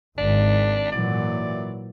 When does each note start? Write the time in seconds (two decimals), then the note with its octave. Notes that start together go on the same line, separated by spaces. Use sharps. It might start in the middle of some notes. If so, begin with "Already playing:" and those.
0.18 G#1 D4
0.92 A#2 E3 F#3 D5